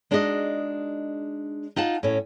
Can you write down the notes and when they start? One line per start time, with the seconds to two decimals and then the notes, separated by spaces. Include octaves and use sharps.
0.11 G#3 D4 D#4 F#4 C#5 D#5
1.76 D#4 F4 F#5 A5
2.03 A2 C#4